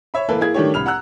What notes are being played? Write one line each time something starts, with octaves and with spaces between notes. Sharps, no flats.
C#5 E5 B5
E3 A#3 E4 A4 B4
A#3 E4 G#4 G#6
D#3 G3 A3 D4 G4 C#5
C2 B5 F6 F7
F#5 A#5 E6 F#6